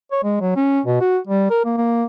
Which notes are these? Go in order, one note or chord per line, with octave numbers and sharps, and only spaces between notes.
C#5
G#3
F#3
C#4
B2
F#4
G3
A#4
A#3
A#3